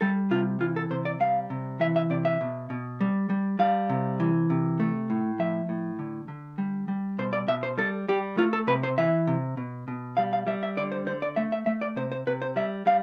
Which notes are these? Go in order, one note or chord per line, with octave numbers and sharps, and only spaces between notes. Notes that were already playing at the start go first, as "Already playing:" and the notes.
G3 A4
C3 F4
E3 F4
A4
C3 C5
D5
G3 F5
C3
E3 E5
E5
C3 D5
E5
B2
B2
G3
G3
G3 F5
C3
E3
C3
A3
A2
F3 E5
A2
D3
D3
G3
G3
B2 C5
D5
B2 E5
C5
G3 A4
G3 G4
A3 F4
A4
C3 B4
C5
E3 E5
C3
B2
B2
G3 F5
F5
G3 E5
E5
D3 D5
C5
D3 C5
D5
A3 E5
E5
A3 E5
D5
C3 C5
C5
C3 B4
C5
G3 E5
G3 F5